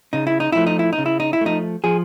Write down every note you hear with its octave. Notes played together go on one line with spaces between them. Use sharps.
C#3 D#4
E4
D#4
F3 A3 E4
D#4
E4
D#4
C#3
E4
D#4
E4
F3 A3 D#4
F3 G#4